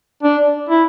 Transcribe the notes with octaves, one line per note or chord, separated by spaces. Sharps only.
D4
E4